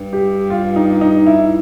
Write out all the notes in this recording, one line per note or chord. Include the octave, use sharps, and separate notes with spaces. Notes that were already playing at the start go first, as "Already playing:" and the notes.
Already playing: G2
G4
F4
D#4
D#4
E4